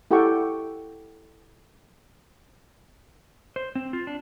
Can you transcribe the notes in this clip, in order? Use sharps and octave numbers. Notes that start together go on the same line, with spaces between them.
E4 G4 A4 F#5 G5 C#6
C5
C4
F4
D4